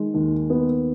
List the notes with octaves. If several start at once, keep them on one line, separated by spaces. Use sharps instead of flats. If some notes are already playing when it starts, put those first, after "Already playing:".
Already playing: D#3 G#3
D#2
B3